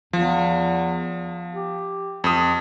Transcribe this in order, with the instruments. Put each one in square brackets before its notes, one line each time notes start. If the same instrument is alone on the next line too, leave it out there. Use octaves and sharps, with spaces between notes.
[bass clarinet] E2 [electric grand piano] F3
[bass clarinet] G4
[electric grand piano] F2 D#6